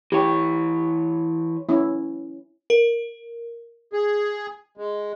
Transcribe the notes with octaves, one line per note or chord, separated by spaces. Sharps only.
E3 G4 C#5
C#4 E4
A#4
G#4
G#3